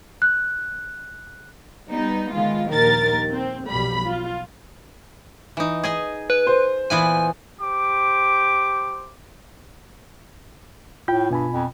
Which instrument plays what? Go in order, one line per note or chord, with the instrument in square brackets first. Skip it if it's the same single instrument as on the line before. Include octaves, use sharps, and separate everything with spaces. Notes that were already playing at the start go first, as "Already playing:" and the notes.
[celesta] F#6
[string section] G3 B3 D#4
D#3 G#3 B3 F4
A#1 D#2 D#3 A#4 A6
C4
B1 F2 G3 B5
F4
[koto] E3 D#4
G#4 D#5 G#5
[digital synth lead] B4
[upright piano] C5
[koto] A#2 E3 B3 [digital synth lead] G#5
[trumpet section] G4 C5 D6
[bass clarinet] A2 [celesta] F4 [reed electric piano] G5 G6
[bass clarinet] G2 [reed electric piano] B2 G#5 B5
[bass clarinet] F2